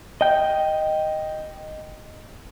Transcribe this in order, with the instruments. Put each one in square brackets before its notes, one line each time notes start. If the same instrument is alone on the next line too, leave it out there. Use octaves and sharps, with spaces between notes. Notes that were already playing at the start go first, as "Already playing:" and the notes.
[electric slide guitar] D#5 G5